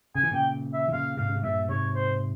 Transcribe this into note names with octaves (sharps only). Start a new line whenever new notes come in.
C#3 G#5
E3
A#2 C#3 G5
E5
E3
A#2 C#3 F5
G#2 C3 F5
C#3
C3
G2 A#2 E5
G#2 C3 C#5
C5